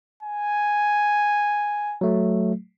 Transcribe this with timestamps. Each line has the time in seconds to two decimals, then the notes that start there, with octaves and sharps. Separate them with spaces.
0.23 G#5
2.01 F#3 A3